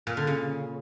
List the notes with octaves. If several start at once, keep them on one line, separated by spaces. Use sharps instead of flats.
A#2
D3
C#3